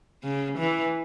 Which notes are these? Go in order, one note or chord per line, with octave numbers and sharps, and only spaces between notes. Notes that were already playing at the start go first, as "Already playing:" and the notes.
C#3
E3